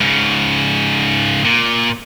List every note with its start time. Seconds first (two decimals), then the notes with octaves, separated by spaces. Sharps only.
0.01 G#2 C#3
1.45 A#2